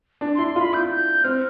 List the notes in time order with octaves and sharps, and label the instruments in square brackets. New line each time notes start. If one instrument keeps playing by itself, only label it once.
[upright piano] D4
[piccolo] C6
[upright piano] E4
[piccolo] C6
[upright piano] F4 [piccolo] B5
[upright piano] E4 [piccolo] G6
[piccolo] G6
[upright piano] C4 [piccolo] F6